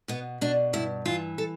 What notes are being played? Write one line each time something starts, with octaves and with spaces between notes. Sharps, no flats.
B2 B3
B2 D4
G2 E4
E3 F4
A4